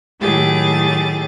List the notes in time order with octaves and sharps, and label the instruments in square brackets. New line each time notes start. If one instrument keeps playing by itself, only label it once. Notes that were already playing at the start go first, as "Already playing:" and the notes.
[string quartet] A2 D#3 F#3 G4 G#4 A6